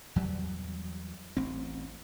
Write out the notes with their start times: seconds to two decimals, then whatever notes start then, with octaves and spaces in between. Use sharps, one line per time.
0.16 E2 F#3 G3
1.37 A1 C4